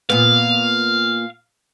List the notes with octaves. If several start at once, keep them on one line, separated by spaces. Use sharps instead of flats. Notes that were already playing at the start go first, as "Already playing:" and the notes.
A#2 B3 F5